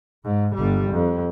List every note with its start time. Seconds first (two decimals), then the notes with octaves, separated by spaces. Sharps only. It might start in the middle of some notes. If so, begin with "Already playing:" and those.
0.24 G#2
0.55 G1 G3
0.92 F2